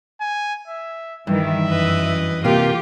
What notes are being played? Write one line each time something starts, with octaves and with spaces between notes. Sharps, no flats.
G#5
E5
G2 D#3 E3 E5
F#2 E3 B4 D#5
C3 A#3 F4 G4 F5